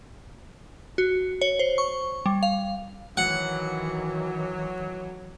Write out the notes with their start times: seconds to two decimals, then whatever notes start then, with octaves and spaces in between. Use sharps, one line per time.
0.98 F#4
1.41 C#5
1.59 C5
1.78 C#6
2.26 G3
2.43 F5
3.17 D#3 E3 F#3 F#5